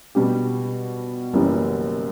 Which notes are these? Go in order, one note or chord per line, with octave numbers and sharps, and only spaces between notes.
B2 G3 D4 G4
F#1 F#2 E3 G3